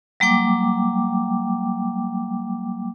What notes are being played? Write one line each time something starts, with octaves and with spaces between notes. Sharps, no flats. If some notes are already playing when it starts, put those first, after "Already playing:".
F#3 G3 A#3 G5 D6